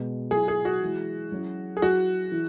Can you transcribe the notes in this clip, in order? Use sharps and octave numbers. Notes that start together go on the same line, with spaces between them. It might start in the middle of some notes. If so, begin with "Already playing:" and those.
Already playing: B2 G#3 B3
F#3 E4 G#4
G#4
F#4
E3 G#3 E4
F#3 C#4 E4
G#4
F#3 E4 F#4
E3